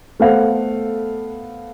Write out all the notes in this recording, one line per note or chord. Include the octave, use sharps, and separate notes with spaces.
A3 B3 A4 C5 F5 F#5